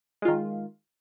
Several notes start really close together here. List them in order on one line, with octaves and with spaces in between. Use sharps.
G#3 F4 D#3